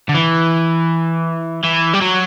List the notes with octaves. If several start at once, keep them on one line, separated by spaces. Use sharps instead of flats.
D3
E3
E3
G3
F#3